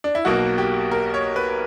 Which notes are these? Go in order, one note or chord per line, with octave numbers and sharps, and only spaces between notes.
D4
E4
B1 B2 A#3 F#4
G4
A#4
C#5
B4